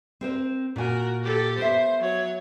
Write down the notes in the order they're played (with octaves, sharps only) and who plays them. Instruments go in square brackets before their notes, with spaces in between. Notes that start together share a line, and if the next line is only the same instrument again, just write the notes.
[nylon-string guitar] C4 A#4 C5
[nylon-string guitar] A#2 G#5 [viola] F#4 A#4
[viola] G4 A4
[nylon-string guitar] B3 E5 [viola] C5
[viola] F#3 C#5